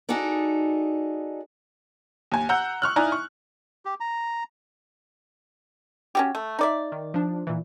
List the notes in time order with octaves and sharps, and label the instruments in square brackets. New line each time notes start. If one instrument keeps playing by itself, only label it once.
[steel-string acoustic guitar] D#4 F#4 G#4 A4 D5
[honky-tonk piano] D#2 G#5
F#5 A#5 E6 F#6 G6
C#6 F6 F#6
D#4 E4 D5 G#5 A#5
C#6
[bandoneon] G4
A#5
[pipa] C#4 F#4 G4
A3
D#4 D5 E5
[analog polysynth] D#3
F3 D4
A#2 E3